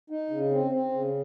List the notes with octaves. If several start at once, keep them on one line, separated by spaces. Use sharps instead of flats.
D#4
C#3
C4
C4
C#3